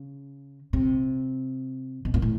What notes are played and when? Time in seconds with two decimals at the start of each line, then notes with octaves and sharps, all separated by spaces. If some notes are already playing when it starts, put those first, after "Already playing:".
Already playing: C#3
0.73 C3
2.05 B2
2.14 A#2
2.22 A2